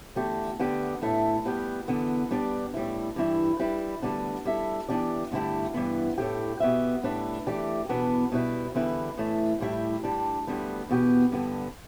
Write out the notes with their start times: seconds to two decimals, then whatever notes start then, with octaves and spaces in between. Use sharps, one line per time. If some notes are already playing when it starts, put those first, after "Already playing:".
0.15 E2 D3 A3 G4
0.59 D3 B3 G4 D5
1.02 A2 A3 E4
1.45 G3 B3 G4
1.88 E2 D3 B3
2.31 G3 B3 D4 G4 D5
2.74 A2 G3 E4
3.16 G2 E3 G3 E4
3.60 G3 E4 B4
4.02 D2 D3 G3 B3 D4
4.45 G3 E4 A4 E5
4.89 E3 B3 D4 G4 D5
5.32 G2 D3 A3 E4 G4
5.74 G2 E3 B3
6.18 A2 A3 E4 G4
6.60 B2 B3 G4 E5
7.03 A2 G3 D4 B4 E5
7.47 E3 A3 G4 D5
7.89 E2 B2 B3 D4 B4
8.32 B2 G3 E4 B4
8.75 E2 D3 G3 E4 B4
9.18 A2 E3 A3
9.60 A2 G3 E4 G4 E5
10.03 G2 G3 D4
10.47 D2 D3 G3 B3
10.89 E2 B2 B3 G4
11.32 G2 D3 B3